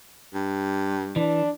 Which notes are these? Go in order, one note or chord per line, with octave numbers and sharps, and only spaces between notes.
G2
E3 D4